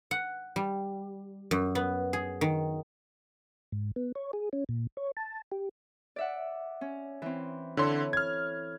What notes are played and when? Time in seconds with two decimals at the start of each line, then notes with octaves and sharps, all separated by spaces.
0.11 F#5
0.56 G3
1.51 F#2
1.75 B3
2.13 G#4
2.41 D#3
3.72 G#2
3.96 B3
4.15 C#5
4.33 G#4
4.53 C#4
4.69 A#2
4.97 C#5
5.17 A5
5.52 G4
6.16 D5 E5 F#5
6.81 C#4
7.22 E3 C4
7.77 D3 E4 A4 C#5 C6
8.13 F6 G#6